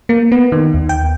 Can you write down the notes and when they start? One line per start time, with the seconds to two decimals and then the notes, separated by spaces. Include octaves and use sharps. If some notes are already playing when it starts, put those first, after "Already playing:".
0.09 A#3
0.32 B3
0.52 D#3
0.74 D#2
0.89 G5